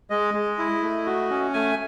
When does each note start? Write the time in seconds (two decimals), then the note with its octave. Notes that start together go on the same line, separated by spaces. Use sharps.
0.10 G#3 D#5
0.34 G#3
0.58 E4
0.82 A3
1.06 F#4
1.30 C#4
1.54 A3 G#5